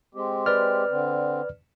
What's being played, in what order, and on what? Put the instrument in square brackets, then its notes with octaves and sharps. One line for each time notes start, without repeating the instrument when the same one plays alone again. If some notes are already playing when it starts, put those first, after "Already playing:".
[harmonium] G#3 C4 G4
[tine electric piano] B4 D5 F6
[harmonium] D3 C4